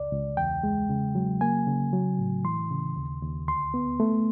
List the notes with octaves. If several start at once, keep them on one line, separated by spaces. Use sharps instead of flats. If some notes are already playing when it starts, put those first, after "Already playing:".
Already playing: C#2 D5
C#2
E2 G5
G#3
C#3
F#3
A#3 G#5
C#3
F#3
A2
E3 C6
C#3
D#2
D#2
D2 C6
B3
A3